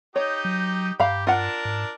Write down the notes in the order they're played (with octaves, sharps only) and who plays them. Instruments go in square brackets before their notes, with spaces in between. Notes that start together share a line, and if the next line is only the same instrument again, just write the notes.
[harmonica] D#4 G4 D#5 [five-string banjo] C#5
[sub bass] F#3
[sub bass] G2 [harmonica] G4 [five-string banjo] F5 A#5 B5
[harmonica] D4 A#4 A5 [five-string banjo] F4 F#5
[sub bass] G#2